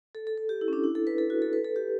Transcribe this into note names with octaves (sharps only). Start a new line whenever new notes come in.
A4
A4
A4
G4
E4
C#4
D4
E4
A4
B4
A4
F#4
A4
B4
A4
G4